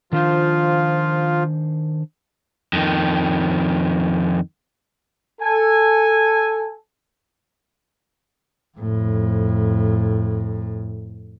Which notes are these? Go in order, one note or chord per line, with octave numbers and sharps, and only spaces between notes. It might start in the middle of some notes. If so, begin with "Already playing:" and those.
D#3 F3 D4 F4 C5
F2 D#3
A4 G#5
F2 A2